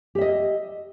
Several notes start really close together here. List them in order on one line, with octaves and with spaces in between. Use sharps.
G4 E5 D#5